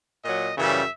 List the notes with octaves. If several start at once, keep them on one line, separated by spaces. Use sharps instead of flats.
A#2 F#3 D#5
F#2 C#3 E3 G3 E5